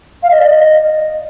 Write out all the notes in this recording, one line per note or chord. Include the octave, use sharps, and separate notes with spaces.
F5
D#5
D5
D#5